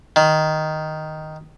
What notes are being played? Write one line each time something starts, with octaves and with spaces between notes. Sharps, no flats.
D#3